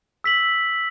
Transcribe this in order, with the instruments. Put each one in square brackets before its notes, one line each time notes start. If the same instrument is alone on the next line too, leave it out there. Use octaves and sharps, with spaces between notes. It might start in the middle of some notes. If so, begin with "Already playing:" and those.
[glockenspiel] E6 B6 F#7